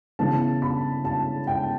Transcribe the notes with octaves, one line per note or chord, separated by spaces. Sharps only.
C#3 E3 B3 A5
B5
A5
G5